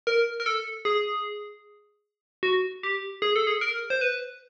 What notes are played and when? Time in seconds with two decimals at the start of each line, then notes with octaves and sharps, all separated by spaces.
0.07 A#4
0.40 A#4
0.46 A4
0.85 G#4
2.43 F#4
2.83 G4
3.22 G#4
3.36 A4
3.47 G#4
3.61 A#4
3.90 C5
4.01 B4